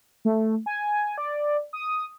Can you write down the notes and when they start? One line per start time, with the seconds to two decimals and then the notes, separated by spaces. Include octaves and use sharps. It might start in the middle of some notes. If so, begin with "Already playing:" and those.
0.25 A3
0.66 G#5
1.18 D5
1.73 D#6